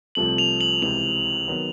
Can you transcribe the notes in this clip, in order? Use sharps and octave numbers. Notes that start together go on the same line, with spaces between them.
C2 C3 F3 A3 F#7
F7
F#7
C#2 C3 E3 F7
D#3 F#3 B3